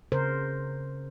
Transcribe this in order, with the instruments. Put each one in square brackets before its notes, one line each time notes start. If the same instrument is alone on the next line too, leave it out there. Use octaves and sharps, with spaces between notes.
[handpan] C#3 A#4 C5